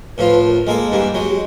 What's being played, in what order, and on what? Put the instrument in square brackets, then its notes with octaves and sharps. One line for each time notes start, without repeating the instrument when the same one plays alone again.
[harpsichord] A2 F3 F4 [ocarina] B4
[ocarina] A#4
[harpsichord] G#3 A#3 A4
[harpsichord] G2 E3 A#3 [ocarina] G4
[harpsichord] F#3 G#3